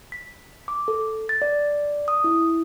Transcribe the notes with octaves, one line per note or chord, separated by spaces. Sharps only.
B6
D6
A4
A6
D5
D#6
E4